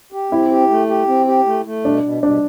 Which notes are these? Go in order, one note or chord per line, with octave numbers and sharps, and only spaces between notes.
G4
C4 E4
G4
A3
G4
C4
G4
A3
A3
B2 D4
B2
B2 D4